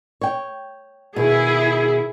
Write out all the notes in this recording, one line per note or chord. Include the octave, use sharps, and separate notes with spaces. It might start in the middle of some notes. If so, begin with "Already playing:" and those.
C#5 G5
B2 D#3 E4 G#4